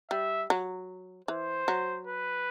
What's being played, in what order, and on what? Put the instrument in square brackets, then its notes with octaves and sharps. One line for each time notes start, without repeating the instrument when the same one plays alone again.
[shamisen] G3 [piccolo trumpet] E5
[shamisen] F#3
[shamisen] E3 [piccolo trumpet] C5
[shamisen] F#3
[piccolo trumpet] B4